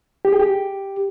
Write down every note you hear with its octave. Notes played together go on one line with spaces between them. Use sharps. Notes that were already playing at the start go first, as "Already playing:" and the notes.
G4
G#4
G4